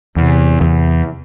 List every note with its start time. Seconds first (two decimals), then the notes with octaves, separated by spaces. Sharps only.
0.16 E2 C3
0.61 E2